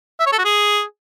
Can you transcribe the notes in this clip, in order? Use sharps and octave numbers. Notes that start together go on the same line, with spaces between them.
E5
C#5
A4
F#4
G#4